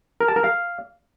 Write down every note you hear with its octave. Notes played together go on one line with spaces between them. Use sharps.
A#4
A5
A#4
F5